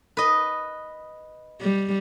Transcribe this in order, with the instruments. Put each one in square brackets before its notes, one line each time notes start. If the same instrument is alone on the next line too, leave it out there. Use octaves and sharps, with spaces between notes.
[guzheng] B4 D#5
[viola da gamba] G3